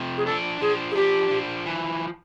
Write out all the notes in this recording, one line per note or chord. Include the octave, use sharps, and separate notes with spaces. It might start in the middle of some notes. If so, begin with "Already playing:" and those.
Already playing: C3 F3
G#4
D4 A4
F3 G#4
G#4
D4 G4
F3
E3